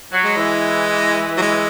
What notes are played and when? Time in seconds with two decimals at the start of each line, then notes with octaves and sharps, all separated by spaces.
0.12 F#3
0.25 G#3
0.37 E3
1.37 F#3
1.41 G#3